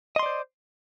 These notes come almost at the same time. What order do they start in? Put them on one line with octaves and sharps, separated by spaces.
D#5 C6 D5 C5